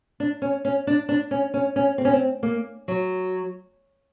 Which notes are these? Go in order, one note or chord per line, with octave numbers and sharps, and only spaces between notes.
D4
C#4
C#4
D4
D4
C#4
C#4
C#4
C4
C#4
C4
A#3
F#3